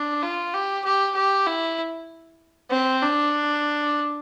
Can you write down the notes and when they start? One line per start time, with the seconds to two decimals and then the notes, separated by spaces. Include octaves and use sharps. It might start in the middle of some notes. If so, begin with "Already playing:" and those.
Already playing: D4
0.23 F4
0.54 G4
0.85 G4
1.16 G4
1.47 E4
2.71 C4
3.02 D4